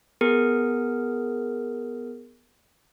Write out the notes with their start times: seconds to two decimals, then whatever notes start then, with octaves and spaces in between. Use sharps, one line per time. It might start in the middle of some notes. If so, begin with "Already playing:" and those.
0.21 B3 G#4 A#4